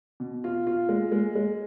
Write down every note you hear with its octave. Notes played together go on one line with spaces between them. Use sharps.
B2
F4
F4
G#3
G#3
G#3